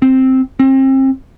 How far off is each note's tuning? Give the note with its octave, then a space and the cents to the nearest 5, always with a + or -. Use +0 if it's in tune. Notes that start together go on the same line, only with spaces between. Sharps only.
C4 +0
C4 +30